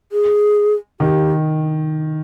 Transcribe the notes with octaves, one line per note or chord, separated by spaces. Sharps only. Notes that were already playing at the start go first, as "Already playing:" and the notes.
G#4
D#3 G4